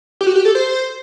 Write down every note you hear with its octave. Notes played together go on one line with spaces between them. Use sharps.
G4
F#4
G4
A4
C5